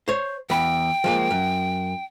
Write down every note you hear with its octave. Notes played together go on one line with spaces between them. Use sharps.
C5 C#5
E2 G5 B5
F3 G#3 A#3
F#2